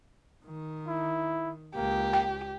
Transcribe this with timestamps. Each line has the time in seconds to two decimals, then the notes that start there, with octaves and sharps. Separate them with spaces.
0.46 D#3
0.87 E4
1.76 C#2 A#3 G4
2.13 G5